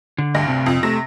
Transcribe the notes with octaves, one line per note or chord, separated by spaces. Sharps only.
D3
D2 G2 A#6
C3
F2
C3 A3 A#6